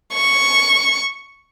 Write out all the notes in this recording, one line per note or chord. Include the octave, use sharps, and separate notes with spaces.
C#6